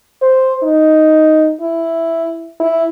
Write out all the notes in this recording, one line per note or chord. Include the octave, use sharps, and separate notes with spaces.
C5
D#4
E4
E4